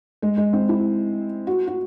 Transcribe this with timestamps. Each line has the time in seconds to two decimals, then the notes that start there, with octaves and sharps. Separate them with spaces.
0.22 G#3
0.37 G#3
0.53 C4
0.69 E4
1.47 F#4
1.67 F#4